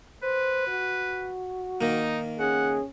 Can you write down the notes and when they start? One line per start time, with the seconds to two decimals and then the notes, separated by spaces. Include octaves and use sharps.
0.23 B4 C5
0.68 F#4
1.81 D#3 A#3 D#4
2.40 C#4 G#4 F#5